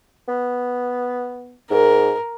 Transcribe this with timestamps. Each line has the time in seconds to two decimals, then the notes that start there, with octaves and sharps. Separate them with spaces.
0.28 B3
1.71 G#2 A#4